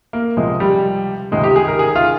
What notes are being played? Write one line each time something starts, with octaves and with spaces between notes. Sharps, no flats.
A#3
C#2 C3 F3 G#3
G3
C#2 C3 D#3 G#3
G4
G#4
A#4
G#4
F4